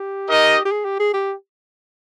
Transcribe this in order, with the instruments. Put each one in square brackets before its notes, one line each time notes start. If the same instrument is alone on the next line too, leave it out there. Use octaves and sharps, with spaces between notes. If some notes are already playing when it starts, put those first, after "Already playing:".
Already playing: [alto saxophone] G4
[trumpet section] D#4 A#4 D#5
[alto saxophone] G4
G#4
G4
G#4
G4